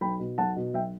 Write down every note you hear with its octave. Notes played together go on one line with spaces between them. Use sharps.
B1 G5 B5
B2
B1 F#5 A5
B2
B1 E5 G5